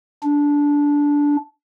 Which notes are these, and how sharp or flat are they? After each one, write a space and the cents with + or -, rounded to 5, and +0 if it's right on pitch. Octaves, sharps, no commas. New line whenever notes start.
D4 -15